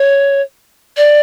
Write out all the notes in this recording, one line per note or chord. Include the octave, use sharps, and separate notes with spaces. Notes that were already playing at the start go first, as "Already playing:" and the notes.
Already playing: C#5
D5